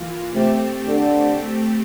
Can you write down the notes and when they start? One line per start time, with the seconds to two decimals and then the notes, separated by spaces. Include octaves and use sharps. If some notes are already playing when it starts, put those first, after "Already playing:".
Already playing: E3 A#3 F4
0.33 C3 A3 C4 G4
0.87 D3